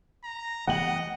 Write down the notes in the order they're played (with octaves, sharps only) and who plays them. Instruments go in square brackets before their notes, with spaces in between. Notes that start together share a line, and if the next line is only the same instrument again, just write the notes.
[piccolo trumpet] A#5
[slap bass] E3 A3 B3 [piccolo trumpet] D#5 [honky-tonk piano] F#5 G5 F#7